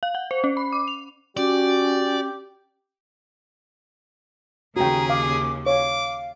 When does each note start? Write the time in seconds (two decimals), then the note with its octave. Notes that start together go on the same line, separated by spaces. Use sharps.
0.03 F5
0.15 F#5
0.31 C5
0.44 C#4
0.57 B5
0.73 D6
0.88 F7
1.37 C#4 F#4 G4 D5
4.76 D#2 C#3 F#4 G#4 G5 A#5
5.10 F5 D6
5.66 C#5 F5 D6